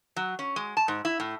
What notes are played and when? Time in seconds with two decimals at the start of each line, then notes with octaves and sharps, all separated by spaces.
0.16 F#3
0.39 C#4
0.56 G#3
0.77 A5
0.88 G#2
1.05 E4
1.20 A2